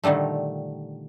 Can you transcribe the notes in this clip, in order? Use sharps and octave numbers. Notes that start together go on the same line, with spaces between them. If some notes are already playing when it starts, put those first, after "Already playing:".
A#2 D3 D#3 G3 A3